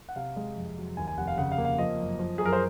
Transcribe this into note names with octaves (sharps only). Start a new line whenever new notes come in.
F#5
C3 F5
G#3
F2
F#3
D#2 G#5
G#5
F1 F#5
F5
C#3 F#5
F5
A#3
F5
F3 D#5
F#2
F3
F#2 G#4
A#4
C5